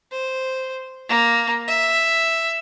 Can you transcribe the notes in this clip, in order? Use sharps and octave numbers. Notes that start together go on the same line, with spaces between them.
C5
A#3
E5